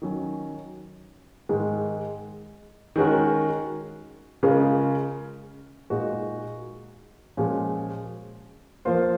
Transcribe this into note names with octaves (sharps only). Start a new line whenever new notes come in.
D#3 F#3 C#4
G#2 D#3 G#3
D#3 G#3 C#4 F#4 A#4
C#3 G#3 C#4 F4 A#4
A#2 G#3 D#4 F#4
A#2 F3 G#3 C#4 F#4
F3 A#3 F4 C5